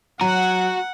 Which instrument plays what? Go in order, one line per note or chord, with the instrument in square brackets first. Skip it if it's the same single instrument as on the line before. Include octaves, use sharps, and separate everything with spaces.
[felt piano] F#3 [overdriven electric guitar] F#4 [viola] F#5 [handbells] A#5